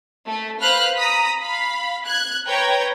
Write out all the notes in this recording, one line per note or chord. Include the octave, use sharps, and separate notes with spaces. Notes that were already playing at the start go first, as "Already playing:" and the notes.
A3
B4 C5 F5 B5 F6 F#6
A#5 B5 D#6 B6
F5 B5
F#6 G#6
B4 C#5 G5 A#5 G#6